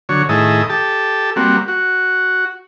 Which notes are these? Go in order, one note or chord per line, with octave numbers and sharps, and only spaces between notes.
D3 F#3 C#5
A2 D#3 E4 G#4 D#5 A5
G4 A4 A5
G3 A#3 C4 F#4
F#4